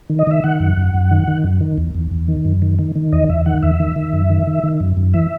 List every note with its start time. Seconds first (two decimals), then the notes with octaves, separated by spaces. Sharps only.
0.10 D#3
0.19 D#5
0.27 D#3 E5
0.44 D#3 F#5
0.60 F#2
0.77 F#2
0.94 F#2
1.11 D#3
1.28 D#3
1.44 F#2
1.61 D#3
1.78 E2
1.95 E2
2.11 E2
2.28 D#3
2.45 F#2
2.62 D#3
2.79 D#3
2.96 D#3
3.12 E2 D#5
3.29 E2 E5
3.46 D#3 F#5
3.63 E2 E5
3.80 D#3
3.96 D#3
4.13 F#2
4.30 D#3
4.47 D#3
4.63 D#3
4.80 F#2
4.97 F#2
5.14 E3 E5